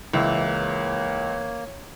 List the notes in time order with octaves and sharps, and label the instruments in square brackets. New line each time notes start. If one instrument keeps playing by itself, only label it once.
[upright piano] C#2 [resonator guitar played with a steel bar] E3 [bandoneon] A#3 [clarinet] C#5